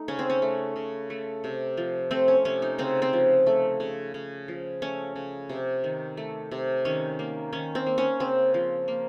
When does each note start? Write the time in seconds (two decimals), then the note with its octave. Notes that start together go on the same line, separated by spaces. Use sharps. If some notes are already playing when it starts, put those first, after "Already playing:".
Already playing: A3 D#4
0.08 C#3 C#4
0.19 C4
0.30 C#4
0.42 A3
0.76 C#3
1.10 A3
1.44 C3
1.77 F3
2.11 A3 C4
2.28 C#4
2.45 C3 C#4
2.62 D#4
2.78 C#3 C4
3.02 C4
3.13 F3
3.47 A3
3.80 C#3
4.14 C#3
4.48 F3
4.82 A3 C#4
5.16 C#3
5.49 C3
5.84 D#3
6.17 A3
6.51 C3
6.85 D#3 C#4
7.19 A#3
7.53 D#3 C#4
7.75 C4
7.86 A#3
7.98 C#4
8.20 C#3 C4
8.54 F3
8.88 A#3